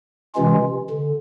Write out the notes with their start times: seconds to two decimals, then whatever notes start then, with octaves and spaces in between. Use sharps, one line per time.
0.35 C3 E3 G#3 C#4 F4
0.90 D3